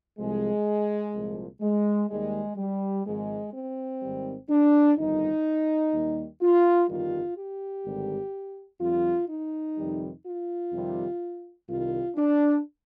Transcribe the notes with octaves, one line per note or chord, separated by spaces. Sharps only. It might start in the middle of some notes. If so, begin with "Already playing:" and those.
C2 C3 F3 G#3
C2 A#2 F3
G#3
D#2 D#3 G3 G#3
G3
G#1 G#2 F3 G#3
C4
G#1 G#2 D#3 G3
D4
G1 F2 D#3 G3 D#4
D#2 D#3 G3
F4
G1 F2 D#3 G3 F4
G4
G#1 G2 D3 G3
F2 D3 G3 F4
D#4
F2 C3 D#3 G3
F4
F2 C3 D#3 G3
C2 C3 D#3 G3 F4
D4